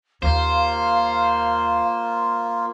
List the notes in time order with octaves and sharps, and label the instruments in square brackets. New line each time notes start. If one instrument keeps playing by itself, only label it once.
[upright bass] D#2 [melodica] A#3 F4 [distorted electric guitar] C5 [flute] F5